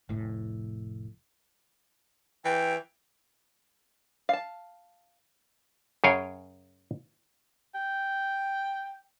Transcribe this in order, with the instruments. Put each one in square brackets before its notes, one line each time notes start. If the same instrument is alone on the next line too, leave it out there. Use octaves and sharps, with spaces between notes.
[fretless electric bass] F1 A2
[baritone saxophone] E3 [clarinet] G5
[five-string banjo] F5 A5
[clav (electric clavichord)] F#2 C#3 G#4 C#5 F5 G5
[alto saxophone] G5